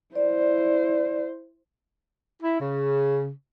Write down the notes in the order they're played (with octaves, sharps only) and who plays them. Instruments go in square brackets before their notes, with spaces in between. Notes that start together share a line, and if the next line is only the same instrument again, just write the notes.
[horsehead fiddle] E4 C5 [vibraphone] D5
[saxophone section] E4
C#3